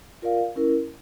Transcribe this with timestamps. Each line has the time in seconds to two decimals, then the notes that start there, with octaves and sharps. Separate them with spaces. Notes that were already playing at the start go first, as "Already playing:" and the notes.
0.22 F4 A#4 D5 F5
0.56 C#4 E4 A#4